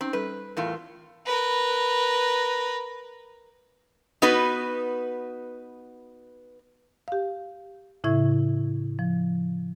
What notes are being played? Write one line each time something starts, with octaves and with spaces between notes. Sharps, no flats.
C4 C#4 D#4
G3 A4 B4
E2 A2 F4 A#4
A#4 B4
B3 D#4 F#4 B4
G4 F5
A2 C#3 E4 E5 C#6 G#6
F3